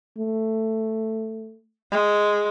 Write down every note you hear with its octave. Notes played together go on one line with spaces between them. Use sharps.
A3
G#3